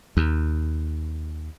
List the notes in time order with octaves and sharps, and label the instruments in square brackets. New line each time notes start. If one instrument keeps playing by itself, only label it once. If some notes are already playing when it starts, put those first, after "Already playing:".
[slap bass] D#2